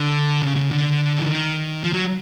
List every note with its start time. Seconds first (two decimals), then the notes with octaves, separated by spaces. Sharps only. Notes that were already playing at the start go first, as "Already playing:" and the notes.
Already playing: D3
0.42 C#3
0.56 C#3
0.71 D3
1.19 E3
1.26 D#3
1.84 F3
1.93 F#3